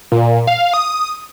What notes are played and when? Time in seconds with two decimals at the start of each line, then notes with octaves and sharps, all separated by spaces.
0.12 A#2
0.47 F5
0.74 D#6